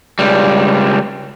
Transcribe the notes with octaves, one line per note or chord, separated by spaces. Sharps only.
C#2 G3